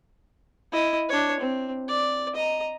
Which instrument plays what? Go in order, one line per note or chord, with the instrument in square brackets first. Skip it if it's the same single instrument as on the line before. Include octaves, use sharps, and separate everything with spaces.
[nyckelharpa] E4 D#5
D4 C#5
C4
D5
D#5 A#5